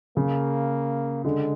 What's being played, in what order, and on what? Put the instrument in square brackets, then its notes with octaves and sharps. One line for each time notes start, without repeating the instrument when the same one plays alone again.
[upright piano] C#3 [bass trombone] A#3
[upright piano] D3 [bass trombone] G#3